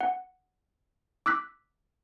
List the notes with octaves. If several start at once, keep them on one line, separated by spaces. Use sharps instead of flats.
F#5
D6 E6 F#6 B6